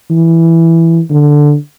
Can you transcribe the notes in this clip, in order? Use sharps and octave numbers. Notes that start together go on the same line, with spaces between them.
E3
D3